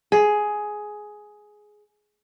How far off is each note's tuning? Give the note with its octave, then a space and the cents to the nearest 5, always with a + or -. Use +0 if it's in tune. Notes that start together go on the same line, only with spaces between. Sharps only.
G#4 +10